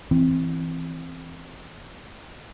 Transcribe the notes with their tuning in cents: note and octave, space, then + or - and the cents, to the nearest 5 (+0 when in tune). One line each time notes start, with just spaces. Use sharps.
E3 +0 C4 +0